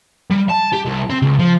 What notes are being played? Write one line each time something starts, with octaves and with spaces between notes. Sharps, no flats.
G3
A5
G4
C2
C4
C#2
F3